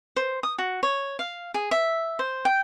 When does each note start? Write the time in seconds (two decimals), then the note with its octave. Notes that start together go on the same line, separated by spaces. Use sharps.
0.16 C5
0.43 D#6
0.58 F#4
0.83 C#5
1.19 F5
1.54 G#4
1.71 E5
2.19 C5
2.45 G5